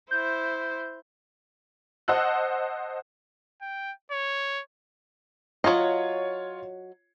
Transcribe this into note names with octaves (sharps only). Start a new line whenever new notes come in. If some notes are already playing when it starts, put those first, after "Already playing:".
E4 C5 G6
C5 D#5 F#5 A5 E6 F#6
G5
C#5
F#3 F4 C#5 D#5